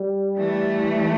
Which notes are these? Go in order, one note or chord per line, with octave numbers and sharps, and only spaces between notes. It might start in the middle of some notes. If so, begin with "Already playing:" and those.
Already playing: G3
E3 A3